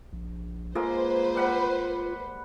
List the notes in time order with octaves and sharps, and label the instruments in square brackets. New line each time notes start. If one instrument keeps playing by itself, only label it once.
[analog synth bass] A#1
[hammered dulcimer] G#2 A#3 G#4 [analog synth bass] F4 [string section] B4 C5
[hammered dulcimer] G3 F#5 B5